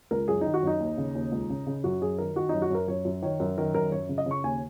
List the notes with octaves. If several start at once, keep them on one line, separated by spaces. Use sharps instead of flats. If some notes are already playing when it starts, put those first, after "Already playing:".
C#2 A#4
F#2 G#4
D#3 D#4
F#4
F#2 D#4
D#2
C#3
D#2
C#2
C#3
C#3
F#2 F#4
F#2 G#4
D#3 A#4
D#3 F#4
F#2 D#4
F#4
F#2 A#4
F#2 C#5
F#2
D#3 C#5
F#2 A#4
D#3 A#4
F#2 A#4
F#2 C#5
C#3
D#5
C#3
C#6
D#2 G#5